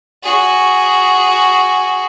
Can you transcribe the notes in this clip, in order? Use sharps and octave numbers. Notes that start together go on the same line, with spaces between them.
F#4 G#4